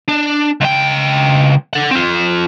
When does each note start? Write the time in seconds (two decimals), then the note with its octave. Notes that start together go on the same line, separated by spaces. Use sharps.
0.09 D4
0.61 C#2 G5
1.74 A4 F#5
1.91 C4 F4